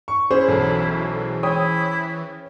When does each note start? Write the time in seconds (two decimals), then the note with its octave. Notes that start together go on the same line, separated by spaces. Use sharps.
0.08 C#6
0.31 C#4 E4 G#4 C5
0.48 B1 E3 A4
1.43 E4 C#5 G5 D#6